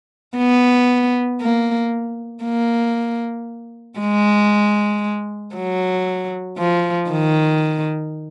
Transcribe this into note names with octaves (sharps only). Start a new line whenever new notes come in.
B3
A#3
A#3
G#3
F#3
F3
D#3